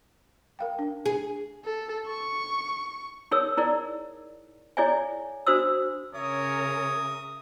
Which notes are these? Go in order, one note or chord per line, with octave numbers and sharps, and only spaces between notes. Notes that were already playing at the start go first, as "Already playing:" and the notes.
A#4 F5 G5
D4
G#4
A4
C#6
D#4 G#4 A#4 C#5 D#6 E6
D#4 E4 G#4 A#4 D5
E4 G#4 C#5 D5 E5 G#5
D4 F#4 C5 D#6 E6
C#3 A#4 C#5 E5 D#6